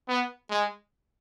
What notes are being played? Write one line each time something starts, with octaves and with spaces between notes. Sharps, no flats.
B3
G#3